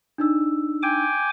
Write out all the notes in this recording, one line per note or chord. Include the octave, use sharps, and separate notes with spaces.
D4 D#4 E6
G5 G#5 D6